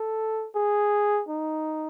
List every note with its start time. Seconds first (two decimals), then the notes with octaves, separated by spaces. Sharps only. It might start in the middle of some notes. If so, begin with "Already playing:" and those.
Already playing: A4
0.56 G#4
1.29 D#4